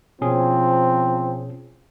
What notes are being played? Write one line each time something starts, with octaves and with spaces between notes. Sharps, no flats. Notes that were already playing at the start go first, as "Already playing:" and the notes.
B2 F3 C4 C#4 G#4